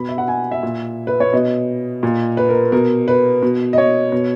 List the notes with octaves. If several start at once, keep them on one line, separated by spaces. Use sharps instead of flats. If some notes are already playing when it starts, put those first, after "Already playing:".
Already playing: B2 B5
E5
F#5
G#5
E5
A#2
B4
C#5
B2 D#5
A#2
B4
A#4
B2 A#4
B4
B2
D#5
C#5
B2